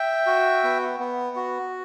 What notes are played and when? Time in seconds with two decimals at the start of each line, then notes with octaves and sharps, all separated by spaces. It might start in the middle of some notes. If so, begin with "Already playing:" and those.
Already playing: E5 G5
0.27 F#4
0.64 B3
1.00 B3
1.36 F#4